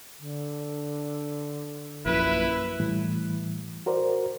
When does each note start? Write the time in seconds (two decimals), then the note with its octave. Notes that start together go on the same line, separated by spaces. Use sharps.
0.19 D3
2.06 A#1 F#2 A#2 E4 B4
2.80 A2 E3 G3
3.86 F#4 A#4 C5 D5